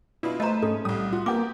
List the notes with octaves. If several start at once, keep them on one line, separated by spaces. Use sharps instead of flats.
B2 D4 E4 F4 B5
A3 B4 C5 D#5 A#5
G#2 C#4 A4
C2 A2 G3 D#6
F4 F#4
A#3 B3 G4 A#4 D6